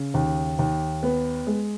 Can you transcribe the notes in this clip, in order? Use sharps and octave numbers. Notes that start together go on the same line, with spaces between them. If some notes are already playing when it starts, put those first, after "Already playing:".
Already playing: C#3
D#2
D#2
B3
G#3